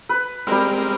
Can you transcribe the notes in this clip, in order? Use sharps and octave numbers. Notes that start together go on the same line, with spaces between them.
B4
G3 G#3 C4 A#4 F5